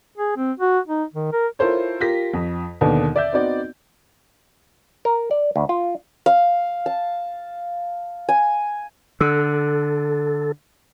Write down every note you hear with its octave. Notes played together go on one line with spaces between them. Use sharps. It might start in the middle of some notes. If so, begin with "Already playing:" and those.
G#4
C4
F#4
D#4
D#3
A#4
E4 F4 A4 A#4 C5 C#5
F4 G4 A#4 A#6 B6
F2
D#2 B2 D3 A#3 D4
D5 E5 G6
B3 C4 D#4 F#4 D5
A#4
D5
D2
F4
F5
A5
G#5
D3 A4